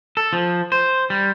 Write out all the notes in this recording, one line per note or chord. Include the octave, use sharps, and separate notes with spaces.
A4
F3
C5
G3